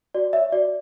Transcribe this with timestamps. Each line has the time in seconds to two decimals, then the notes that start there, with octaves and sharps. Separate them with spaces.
0.14 F#4 D5
0.33 C#5 E5
0.52 F#4 D5